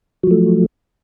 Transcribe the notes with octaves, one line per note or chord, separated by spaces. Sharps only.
F3 F#3 A3